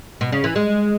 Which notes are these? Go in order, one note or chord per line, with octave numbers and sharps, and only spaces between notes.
B2
C#3
E3
G#3